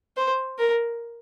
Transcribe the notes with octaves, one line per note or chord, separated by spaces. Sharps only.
C5
A#4